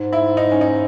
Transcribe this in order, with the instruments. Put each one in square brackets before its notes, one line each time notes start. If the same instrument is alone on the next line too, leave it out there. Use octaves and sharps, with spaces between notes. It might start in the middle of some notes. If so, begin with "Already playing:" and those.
Already playing: [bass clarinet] G#2
[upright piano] E4
D#4
C#4
D#4